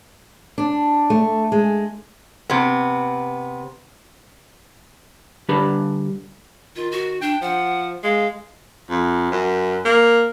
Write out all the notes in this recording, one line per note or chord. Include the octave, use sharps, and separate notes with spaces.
D4
A3
G#3
C3 B3
D3 G3 D4 G4 B4 B5
D#3 F4
F#4
D4 G5
F3 F#5
G#3 F5
F2
F#2
A#3